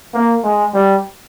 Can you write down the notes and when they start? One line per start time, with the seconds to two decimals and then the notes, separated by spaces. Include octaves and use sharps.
0.14 A#3
0.44 G#3
0.74 G3